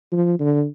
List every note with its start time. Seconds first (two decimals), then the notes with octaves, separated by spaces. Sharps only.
0.12 F3
0.40 D3